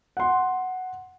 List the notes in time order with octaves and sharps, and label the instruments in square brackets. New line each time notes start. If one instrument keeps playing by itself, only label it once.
[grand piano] F#5 C6